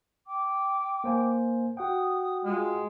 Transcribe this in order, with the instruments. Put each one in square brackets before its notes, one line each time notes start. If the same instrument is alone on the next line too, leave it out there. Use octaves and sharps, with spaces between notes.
[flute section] G5 D6
[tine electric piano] A#3 C5 G#5
[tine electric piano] F#4 F#5 G5 [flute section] D#6
[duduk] G#3 [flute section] F4 F6